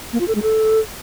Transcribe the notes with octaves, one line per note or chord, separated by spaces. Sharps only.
A#3
F4
A4
G#3
A4